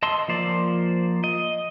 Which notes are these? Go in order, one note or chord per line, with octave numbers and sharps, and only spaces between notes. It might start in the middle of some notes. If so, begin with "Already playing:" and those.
D#5 A5 C6 E6
F3 A#3 C5 D5
D#5